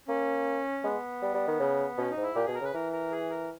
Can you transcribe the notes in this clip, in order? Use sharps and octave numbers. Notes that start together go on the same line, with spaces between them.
A#3 C#4
G#3 B3
G3
G3
D#3
C#3
B2 C#4
D#4
G#2
E4
A#2 G4
B2 G#4
A#4
C#3 B4
E3 A#4
A#4
G#4
A#4